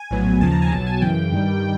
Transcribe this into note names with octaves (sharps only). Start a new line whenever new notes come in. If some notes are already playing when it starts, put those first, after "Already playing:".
Already playing: G#5
A#1 A2 F#3 B3
D#2 C#3 F3 A5
A#5
G#5
B1 B2 F#3 A5
G#5
F#2 C#3 E3 G5
G2 D#3 G3